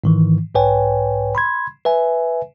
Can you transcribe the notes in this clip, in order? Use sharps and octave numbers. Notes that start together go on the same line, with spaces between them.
G#2 D#3 E3
B1 G#2 B4 C#5 G5 G#5
B5 C6 G#6
B4 E5 G#5